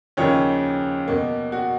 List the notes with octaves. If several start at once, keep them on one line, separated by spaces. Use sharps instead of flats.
D#2 C#3 F3 A#3 C#5
B2 A#3
F#4